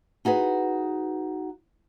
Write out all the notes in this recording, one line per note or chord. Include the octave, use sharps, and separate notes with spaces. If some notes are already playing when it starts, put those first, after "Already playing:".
D#4 F#4 G#4 B4